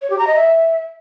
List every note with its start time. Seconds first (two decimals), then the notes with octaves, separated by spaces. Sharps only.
0.02 C#5
0.10 G4
0.19 A#5
0.27 D#5
0.36 E5